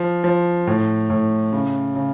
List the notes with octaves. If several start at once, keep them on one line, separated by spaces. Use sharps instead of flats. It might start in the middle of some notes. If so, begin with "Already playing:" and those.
Already playing: F3
F3
A2
A2
C#3
C#3